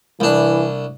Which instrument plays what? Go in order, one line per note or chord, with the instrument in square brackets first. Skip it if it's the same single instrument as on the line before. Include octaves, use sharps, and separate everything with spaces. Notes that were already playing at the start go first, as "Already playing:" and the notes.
[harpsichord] C2 D4 [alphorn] E3